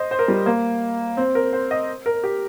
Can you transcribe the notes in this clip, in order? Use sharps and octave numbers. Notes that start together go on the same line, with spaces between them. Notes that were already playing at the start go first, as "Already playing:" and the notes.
Already playing: C5 D#5
C5
A#4
G3
A#3
C4
A#4
C5
D#5
A#4
G4